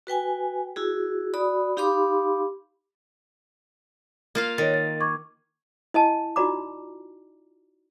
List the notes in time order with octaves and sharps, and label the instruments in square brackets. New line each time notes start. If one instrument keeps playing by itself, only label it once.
[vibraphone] F#4 B4 G5 G#5
E4 F#4 G#4
F#4 D5 B5 D#6
D#4 G4 F5 B5 C6 D6
[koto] A#3 F4 F5
[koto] D#3 [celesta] C#5 D#5 A6
[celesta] A6
C#6 D6 G#6
[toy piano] E4 D#5 G#5 A5
D#4 F4 F#4 D5 A#5 D6